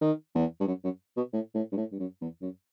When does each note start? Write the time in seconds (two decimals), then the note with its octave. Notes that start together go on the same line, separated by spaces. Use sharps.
0.01 D#3
0.35 E2
0.60 G2
0.67 F#2
0.84 F#2
1.17 B2
1.33 A2
1.55 A2
1.72 G2
1.77 A2
1.92 G2
1.99 F#2
2.21 E2
2.42 F#2